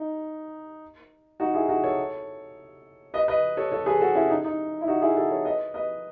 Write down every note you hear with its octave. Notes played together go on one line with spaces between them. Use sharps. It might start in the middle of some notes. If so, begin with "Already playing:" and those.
Already playing: D#4
D#4 F#4
E4 G#4
D#4 F#4
A4 C#5
B4 D#5
B4 D#5
A4 C#5
A4 C#5
G#4 B4
F#4 A4
C#4 E4
D#4
D#4
E4
D#4 F#4
E4 G#4
F#4 A4
A4 C#5
B4 D#5
B4 D#5